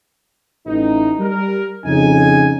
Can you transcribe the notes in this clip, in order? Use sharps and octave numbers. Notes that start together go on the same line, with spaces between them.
A1 D#4
G3 A#4
F2 C#3 D#4 G#5